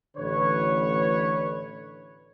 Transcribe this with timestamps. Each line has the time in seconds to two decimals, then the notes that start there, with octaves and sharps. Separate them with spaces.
0.17 A1 D3 B4 C#5